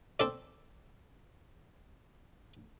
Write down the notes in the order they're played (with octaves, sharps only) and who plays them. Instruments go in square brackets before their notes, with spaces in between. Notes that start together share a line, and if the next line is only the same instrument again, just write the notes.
[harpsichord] C4 A4 D5